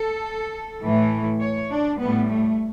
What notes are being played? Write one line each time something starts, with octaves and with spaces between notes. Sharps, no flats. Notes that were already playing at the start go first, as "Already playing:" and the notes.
Already playing: A4
A2 E3 A3
C#5
D4
A2 G3 B3
A3